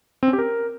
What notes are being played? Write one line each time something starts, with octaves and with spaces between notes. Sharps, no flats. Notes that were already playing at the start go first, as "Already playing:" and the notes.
C4
C#4
G4
A#4